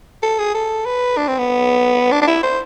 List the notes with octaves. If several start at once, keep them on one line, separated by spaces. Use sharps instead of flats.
A4
G#4
A4
B4
D4
C4
B3
D4
D4
E4
C5